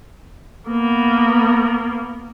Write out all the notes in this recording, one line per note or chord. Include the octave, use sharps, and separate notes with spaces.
A#3 B3